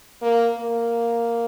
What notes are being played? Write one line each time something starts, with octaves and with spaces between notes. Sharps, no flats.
A#3
A#3